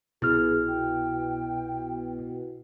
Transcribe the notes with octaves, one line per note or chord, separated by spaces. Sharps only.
C2 B2 E4 G#4 F6
G5